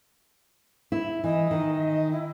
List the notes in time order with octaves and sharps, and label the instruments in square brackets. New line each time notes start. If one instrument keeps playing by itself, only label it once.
[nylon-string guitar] E4
[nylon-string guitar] E3 [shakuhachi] D#5
[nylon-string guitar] D#3
[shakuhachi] E4